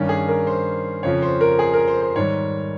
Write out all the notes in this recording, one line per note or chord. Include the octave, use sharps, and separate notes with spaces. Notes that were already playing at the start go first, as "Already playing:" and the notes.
Already playing: G2 D#3 G3 C#4
G#4
A#4
C5
F2 C#3 F3 C#5
C5
A#4
G#4
A#4
C5
C5
G#2 D#3 G3 C#5